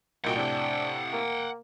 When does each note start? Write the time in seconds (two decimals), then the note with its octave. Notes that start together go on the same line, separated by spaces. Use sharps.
0.24 C2 A#2 D#3 F#4 F#5 G5
0.36 A2 C3 D4
1.13 A#3